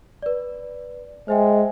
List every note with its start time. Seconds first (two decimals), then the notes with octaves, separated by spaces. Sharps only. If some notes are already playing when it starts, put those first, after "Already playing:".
0.22 B4 D5
1.28 G#3 C5 E5 G5